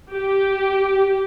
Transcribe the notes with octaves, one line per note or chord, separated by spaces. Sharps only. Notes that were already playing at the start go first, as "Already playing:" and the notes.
G4